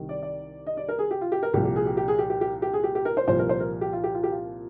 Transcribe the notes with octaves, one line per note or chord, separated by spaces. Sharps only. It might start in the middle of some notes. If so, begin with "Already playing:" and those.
Already playing: C2 C3 D#3
D5
D5
D#5
D5
A#4
G#4
G4
F4
G4
A#4
C2 A#2 F3 G4
G4
G#4
G4
G4
G#4
G4
G4
G4
G4
G#4
G4
G4
A#4
C5
C2 A#2 F3 C5
A#4
C5
A#4
G4
F4
G4
F4
G4
F4